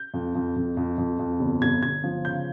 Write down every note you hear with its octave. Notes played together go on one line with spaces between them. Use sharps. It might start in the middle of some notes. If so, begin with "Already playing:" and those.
Already playing: G6
F2
F2
F2
F2
F2
F2
G1
G1 G#6
G1 G#6
F3
C#3 G6